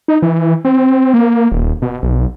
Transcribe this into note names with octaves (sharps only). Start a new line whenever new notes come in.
D#4
E3
C4
A#3
D#1
B2
B1